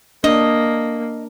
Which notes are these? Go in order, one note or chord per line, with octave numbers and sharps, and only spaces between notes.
A#3 D4 D#5